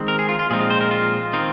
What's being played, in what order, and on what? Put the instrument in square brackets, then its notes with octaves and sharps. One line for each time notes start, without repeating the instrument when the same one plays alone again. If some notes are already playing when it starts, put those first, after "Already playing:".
Already playing: [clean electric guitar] D#3 G#3 C4
A#4
G#4
F4
F4
A#2 F3 G#3 C4 D#4 G#4
F4
C5
A#4
F4
D#3 C4 D#4